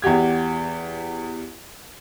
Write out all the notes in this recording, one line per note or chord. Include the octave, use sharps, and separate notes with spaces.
E2 F#4 G4 G#6